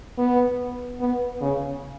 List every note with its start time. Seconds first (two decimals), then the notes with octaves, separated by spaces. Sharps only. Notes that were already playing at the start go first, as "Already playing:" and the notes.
0.18 B3
1.01 B3
1.41 C#3